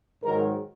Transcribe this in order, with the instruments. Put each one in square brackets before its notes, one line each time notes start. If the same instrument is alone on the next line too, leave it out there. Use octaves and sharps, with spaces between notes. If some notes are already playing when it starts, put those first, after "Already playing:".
[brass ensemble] G#2 D#3 F#3 A#4